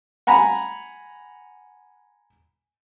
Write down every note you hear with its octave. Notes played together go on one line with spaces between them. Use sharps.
F#5 G#5 A#5 B5